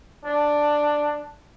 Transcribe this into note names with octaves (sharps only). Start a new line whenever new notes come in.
D4